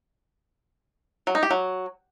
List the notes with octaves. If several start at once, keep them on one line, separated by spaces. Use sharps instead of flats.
F#3
D#4
G4
F#3